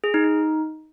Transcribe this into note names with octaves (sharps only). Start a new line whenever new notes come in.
G#4
D#4
D#4